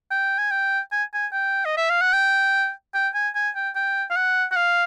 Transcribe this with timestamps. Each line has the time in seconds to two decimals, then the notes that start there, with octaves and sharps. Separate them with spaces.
0.11 G5
0.38 G#5
0.51 G5
0.92 G#5
1.14 G#5
1.32 G5
1.65 D#5
1.77 E5
1.90 F5
2.01 F#5
2.14 G5
2.94 G5
3.15 G#5
3.35 G#5
3.55 G5
3.75 G5
4.10 F5
4.16 F#5
4.52 F#5
4.56 F5